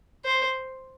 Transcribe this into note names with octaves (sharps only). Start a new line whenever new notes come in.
C5